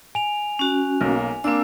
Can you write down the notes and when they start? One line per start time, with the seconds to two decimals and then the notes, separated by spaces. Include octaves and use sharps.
0.15 G#5 F7
0.59 C#4 F#4
1.01 B1 A#3
1.44 A#3 C4 D4 E6